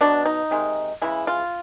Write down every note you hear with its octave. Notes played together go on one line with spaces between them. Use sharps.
B2 F#3 B3 D4
D#4
C3 D#3 G#3
C#3 E3 G#3 E4
F4